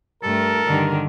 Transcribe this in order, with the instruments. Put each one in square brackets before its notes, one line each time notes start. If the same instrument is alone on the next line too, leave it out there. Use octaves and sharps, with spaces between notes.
[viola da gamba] G2 A3 [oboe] A4 [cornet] A#4
[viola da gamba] G2 D3 D#3